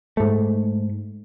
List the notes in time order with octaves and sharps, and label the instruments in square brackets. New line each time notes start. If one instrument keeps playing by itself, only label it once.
[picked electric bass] G#2 A3